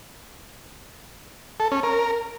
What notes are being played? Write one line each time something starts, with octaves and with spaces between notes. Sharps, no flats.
A4
C#4
A#4